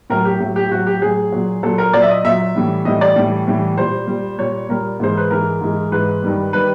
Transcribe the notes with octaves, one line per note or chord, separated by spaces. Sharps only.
A2 F#3 A#4
G4
A2 F#3
G4
A2 F#3 F#4
G4
A2 F#3 G#4
A#2 F#3
A#2 F#3 A4
A#4
A#2 F#3 D5
E5
D#5
A#2 F#3 E5
A2 E3 G3
A2 E3 G3 D#5
D5
A2 E3 G3
A2 E3 G3
A#2 G3 C5
A#2 G3
A#2 G3 C#5
A#2 G3 A#4
G#2 E3 G#3 C5
B4
G#2 E3 G#3 A#4
G#2 E3 G#3
G#2 E3 G#3 B4
G2 D#3 G3
D#3 G3 B4